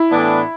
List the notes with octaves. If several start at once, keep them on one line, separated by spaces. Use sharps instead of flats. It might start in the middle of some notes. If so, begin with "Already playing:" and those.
Already playing: E4
A2 E3 B3 D4